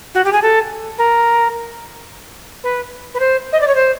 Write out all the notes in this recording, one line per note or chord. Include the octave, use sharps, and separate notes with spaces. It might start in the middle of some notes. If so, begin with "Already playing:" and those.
F#4
G4
G#4
A4
A#4
B4
B4
C5
D#5
D5
C#5
C5